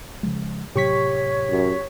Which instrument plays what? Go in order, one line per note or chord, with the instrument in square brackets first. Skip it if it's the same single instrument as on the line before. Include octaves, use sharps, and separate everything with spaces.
[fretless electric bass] C#3 F3 G#3
[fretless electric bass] A2 C3 F#3 [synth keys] G4 C#6 B6 [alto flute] C#5
[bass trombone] F#2